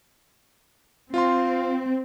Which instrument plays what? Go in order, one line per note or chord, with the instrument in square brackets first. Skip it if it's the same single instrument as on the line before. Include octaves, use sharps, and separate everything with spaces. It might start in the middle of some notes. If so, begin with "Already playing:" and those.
[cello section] C4 [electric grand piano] F4 F5 C6